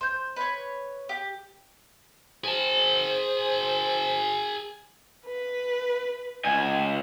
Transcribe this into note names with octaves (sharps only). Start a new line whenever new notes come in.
C5 C6 G6
B4 C#5
G4
G#4 C5 A5
B4
C#2 G#5